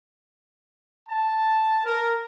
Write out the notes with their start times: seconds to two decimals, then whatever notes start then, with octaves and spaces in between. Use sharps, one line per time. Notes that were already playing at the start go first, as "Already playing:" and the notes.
1.09 A5
1.84 A#4